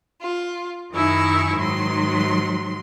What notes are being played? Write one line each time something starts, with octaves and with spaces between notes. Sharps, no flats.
F4
F#2 D#3 D#4 E4 G#5 C#6
G#2 D#3 F#3 C6